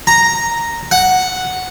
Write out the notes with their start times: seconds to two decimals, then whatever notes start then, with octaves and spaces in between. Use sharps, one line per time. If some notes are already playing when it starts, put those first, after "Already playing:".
0.07 A#5
0.91 F#5